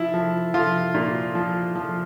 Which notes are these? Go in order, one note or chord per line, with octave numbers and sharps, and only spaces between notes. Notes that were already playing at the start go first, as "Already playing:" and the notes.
Already playing: F3 E4
F3
F3 F4
A#2
F3
F3